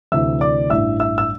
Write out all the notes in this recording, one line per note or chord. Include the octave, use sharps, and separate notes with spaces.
D2 C3 E3 E5 E6
D5 D6
A1 G2 E3 E5 E6
E5 E6
E6